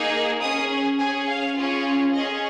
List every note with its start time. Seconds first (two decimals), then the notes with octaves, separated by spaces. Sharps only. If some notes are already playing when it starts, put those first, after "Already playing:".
Already playing: A#3 D#4 G#4
0.41 C#4 G#4 D#6
0.99 C#4 G#4 G#5
1.28 F5
1.57 C#4 F4 G#4
2.13 C#4 G#4 D#5